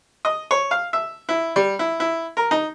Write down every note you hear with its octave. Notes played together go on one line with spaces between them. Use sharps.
D#5
C#5
F5
E5
E4
G3
E4
E4
A#4
D#4